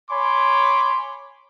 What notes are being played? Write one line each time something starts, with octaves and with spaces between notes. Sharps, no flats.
C#5 G#5 B5 C6 D6